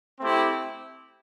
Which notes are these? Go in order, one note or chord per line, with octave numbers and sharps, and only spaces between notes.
A3 C4 E4 G4